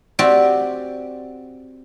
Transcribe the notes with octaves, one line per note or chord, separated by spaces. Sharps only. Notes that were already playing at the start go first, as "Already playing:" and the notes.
C4 F#4 G4 D5